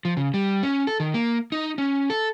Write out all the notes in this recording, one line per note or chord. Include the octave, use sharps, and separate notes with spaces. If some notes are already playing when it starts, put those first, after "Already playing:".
F3
C#3
G3
C#4
A4
D#3
A#3
D#4
C#4
A4